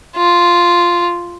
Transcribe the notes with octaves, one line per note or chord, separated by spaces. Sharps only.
F4